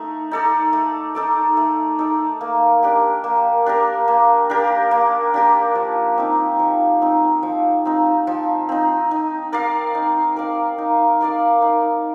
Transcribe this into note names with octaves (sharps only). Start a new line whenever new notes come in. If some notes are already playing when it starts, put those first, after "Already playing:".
Already playing: A3 D#4
D#4 A4 D5
A3
D#4 A4 D5
A3
D#4 A4 D5
A#3
D4 G4 A#4
A#3
D4 G4 A#4
A#3
D4 G4 A#4
A#3
D4 G4 A#4
F3
C4 D#4
F3
C4 D#4
F3
C4 D#4
F3
C4 D#4
D#4
A#4 D5 F5
D#4
A#4 D5 F5
D#4
A#4 D5 F5
D#4